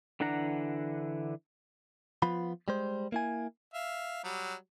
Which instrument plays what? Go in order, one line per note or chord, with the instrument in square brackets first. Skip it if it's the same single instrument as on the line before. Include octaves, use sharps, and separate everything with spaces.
[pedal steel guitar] D3 E3 D4 F#5 A#5
[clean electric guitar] F3 B3 F4 B5
G3 G#3 C5
A#3 E4 G#5
[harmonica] E5 F5
F#3 G3